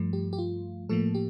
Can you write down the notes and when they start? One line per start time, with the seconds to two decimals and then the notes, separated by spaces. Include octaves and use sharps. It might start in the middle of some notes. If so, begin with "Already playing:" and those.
Already playing: G2 F3 A3
0.13 G4
0.33 G4
0.38 F4
0.89 A2 F3 A3 A#3 A4
1.15 G4